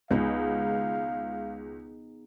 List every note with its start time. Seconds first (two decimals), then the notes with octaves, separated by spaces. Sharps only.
0.11 C#2 B3 D#4 G#4 F5